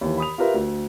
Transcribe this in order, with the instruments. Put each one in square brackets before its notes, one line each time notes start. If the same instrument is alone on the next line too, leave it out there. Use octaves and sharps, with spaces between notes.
[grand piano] D#2 E3
B5 D#6 F7
F4 G4 A#4 B4 E5
D2